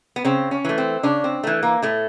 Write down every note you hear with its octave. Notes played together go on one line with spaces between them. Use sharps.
B3
C#3 C4
C#4
E3 A3
C4
C#3 D4
C4
E3 A3
A#3
A2 A3